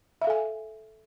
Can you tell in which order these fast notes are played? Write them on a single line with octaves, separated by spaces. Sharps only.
E5 F5 A4 G#5